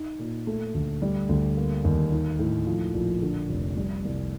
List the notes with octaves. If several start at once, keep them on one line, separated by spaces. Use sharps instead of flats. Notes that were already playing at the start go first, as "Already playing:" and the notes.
Already playing: D#4
A#2
A3
D2
G3
D2
A#3
D#2
D#4
A2
F3
A#1
D3
F1
G3
C2